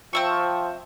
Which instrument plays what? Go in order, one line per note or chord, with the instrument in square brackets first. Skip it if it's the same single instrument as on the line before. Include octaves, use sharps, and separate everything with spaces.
[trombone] F3 [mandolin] C4 E5 C#6